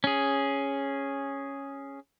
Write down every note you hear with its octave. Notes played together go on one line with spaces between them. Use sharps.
C#4 G#4